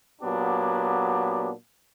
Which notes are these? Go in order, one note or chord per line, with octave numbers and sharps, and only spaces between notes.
A#2 F#3 B3 D4 G4